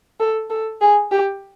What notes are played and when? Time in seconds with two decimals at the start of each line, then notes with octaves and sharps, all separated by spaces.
0.20 A4
0.50 A4
0.81 G#4
1.11 G4